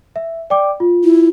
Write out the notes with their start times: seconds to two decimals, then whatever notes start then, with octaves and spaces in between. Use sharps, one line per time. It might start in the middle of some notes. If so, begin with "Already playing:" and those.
0.16 E5
0.50 D5 G5 D6
0.80 F4
1.04 E4